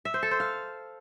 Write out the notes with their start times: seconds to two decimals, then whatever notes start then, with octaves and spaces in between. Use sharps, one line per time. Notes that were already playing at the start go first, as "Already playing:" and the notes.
0.05 E5
0.14 C5
0.23 A4
0.31 C5
0.40 F5